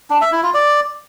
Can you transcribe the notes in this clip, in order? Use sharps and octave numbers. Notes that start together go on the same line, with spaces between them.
D4
E5
E4
F4
D5